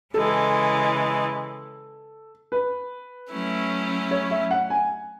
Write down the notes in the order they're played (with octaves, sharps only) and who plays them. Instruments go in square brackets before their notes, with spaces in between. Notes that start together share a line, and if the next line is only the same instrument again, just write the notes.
[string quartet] C#3 E3 G#3 [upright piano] A4
[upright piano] B4
[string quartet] F#3 A3 C#4 E4
[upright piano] C#5
E5
F#5
G#5